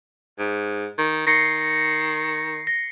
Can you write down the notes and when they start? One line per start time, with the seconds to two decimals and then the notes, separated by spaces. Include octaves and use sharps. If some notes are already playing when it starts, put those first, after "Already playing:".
0.39 G#2
0.98 D#3
1.27 D#3 A#6 C7 C#7
2.67 A#6